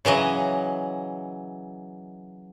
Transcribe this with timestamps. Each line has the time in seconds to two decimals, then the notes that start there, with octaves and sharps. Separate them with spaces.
0.05 C#3 E3 F#3 D#5